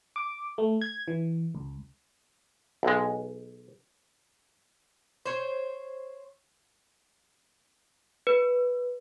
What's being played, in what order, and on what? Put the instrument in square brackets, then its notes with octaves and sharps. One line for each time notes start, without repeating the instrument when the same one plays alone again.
[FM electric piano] D6
A3
G#6
E3
C#2
[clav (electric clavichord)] B1 G#3
[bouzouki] C5 C#5
[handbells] B4